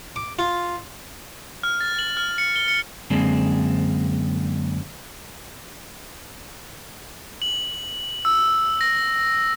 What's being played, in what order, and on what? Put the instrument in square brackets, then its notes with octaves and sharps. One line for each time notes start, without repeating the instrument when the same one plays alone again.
[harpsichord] D6
F4
[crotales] F6
A6
F#7
F6
C#7
G7
C#7
[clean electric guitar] F#2 D3 G#3 A#3 C4 D4
[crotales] F#7
E6
A#6